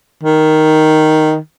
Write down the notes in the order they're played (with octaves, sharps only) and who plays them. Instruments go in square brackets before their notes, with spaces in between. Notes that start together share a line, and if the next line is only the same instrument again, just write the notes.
[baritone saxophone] D#3